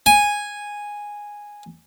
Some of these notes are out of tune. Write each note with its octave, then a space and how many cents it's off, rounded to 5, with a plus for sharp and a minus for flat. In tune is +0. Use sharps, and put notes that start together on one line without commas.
G#5 -5